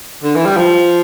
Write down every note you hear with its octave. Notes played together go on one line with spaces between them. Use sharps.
D3
E3
G3
F3